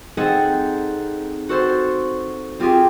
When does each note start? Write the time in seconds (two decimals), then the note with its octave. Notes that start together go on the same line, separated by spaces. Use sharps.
0.17 C4 D#4 G#4 A4 F#5
1.49 F#4 A4 C5
2.60 C4 F4 G4 G#4